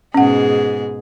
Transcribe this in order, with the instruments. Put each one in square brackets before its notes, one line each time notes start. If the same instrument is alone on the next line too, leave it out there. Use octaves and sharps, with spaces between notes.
[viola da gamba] G#2 B2 G#4 [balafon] C#4 F#5